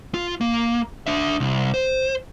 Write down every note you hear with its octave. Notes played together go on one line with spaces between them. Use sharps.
F4
A#3
D4 E5
C2
C5